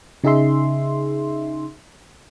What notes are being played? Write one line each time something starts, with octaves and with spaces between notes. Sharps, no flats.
C#3 D#4 G#4 E5 C6